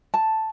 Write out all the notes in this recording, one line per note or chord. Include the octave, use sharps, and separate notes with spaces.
A5